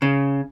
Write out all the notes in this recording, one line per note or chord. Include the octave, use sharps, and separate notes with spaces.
C#3